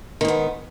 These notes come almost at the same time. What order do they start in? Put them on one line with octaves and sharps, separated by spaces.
D#3 G#2 B3